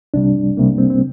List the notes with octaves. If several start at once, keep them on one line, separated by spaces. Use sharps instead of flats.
C2 C3 G3 D4
C2 C3 G3 A#3
C4
C4